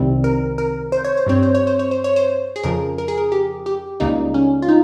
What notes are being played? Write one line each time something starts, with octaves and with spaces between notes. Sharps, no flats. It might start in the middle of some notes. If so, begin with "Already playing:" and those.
Already playing: C2 C3 D#3 G3 C4
A#4
A#4
C5
C#5
C5
G2 G3 C4 C#5
C5
C#5
C5
C#5
C5
C#5
C5
G#4
F2 C#3 F3 A#4
A#4
G#4
A#4
G4
G4
C#2 C#3 G3 A#3 D#4
C#4
F4
D#4